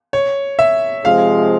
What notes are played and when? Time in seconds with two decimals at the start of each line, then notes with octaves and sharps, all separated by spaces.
0.13 C#5
0.59 E5
1.04 C3 F3 G#3 F5